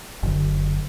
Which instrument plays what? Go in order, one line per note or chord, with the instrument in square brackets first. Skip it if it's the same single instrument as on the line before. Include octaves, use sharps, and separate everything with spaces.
[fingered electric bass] F#1 D3